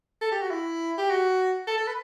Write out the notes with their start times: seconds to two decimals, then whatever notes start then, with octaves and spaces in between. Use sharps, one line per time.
0.21 A4
0.32 G4
0.42 F#4
0.51 E4
0.98 G4
1.10 F#4
1.68 A4
1.78 A4
1.88 B4